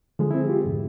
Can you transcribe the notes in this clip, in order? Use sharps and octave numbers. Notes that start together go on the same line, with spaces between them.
D3 F3 G#3 G#4
C4 E4
G#3 F4 G4
F2 G#2 C3